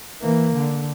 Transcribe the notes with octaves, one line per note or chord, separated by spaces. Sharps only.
E3 A#3
D3